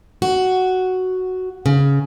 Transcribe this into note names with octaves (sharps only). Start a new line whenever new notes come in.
F#4
C#3